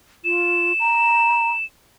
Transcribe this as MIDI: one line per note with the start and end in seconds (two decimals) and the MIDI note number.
0.24 0.73 65
0.24 1.65 100
0.80 1.51 82